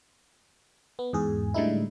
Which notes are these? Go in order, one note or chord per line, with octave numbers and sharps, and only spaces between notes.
B3
E2 G#2 G#4
A2 D3 G3 G#3 D#4 E4